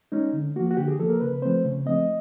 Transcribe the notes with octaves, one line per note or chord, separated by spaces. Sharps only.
G#3 C#4 D#4
D3
F3 A#3 F#4
F#4
D3 G4
G#4
F3 A#3 A4
A#4
C#3 B4
F3 A3 C4 C5
C#3
F3 A3 C4 D#5